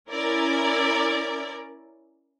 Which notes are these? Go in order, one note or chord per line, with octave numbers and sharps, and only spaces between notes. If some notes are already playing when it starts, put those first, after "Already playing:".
C#4 E4 A#4 D5